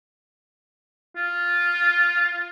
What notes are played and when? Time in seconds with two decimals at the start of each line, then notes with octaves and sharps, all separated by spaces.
1.16 F4